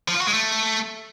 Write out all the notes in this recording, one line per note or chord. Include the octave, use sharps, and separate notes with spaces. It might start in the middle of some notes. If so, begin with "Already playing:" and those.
F3
F4
F#4
G#3
A3